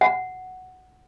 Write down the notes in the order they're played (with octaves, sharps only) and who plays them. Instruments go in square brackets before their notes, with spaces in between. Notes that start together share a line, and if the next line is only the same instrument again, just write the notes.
[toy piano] F#5